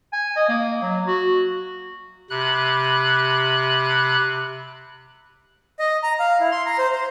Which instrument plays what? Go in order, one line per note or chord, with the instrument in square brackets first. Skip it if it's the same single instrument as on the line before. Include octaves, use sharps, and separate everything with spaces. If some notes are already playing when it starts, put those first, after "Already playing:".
[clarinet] G#5
D#5
A#3
F#3
F#4
[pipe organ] C3 B5 F#6
[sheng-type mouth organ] D#5
A#5
F5
E4
C6
A#5
C5
C5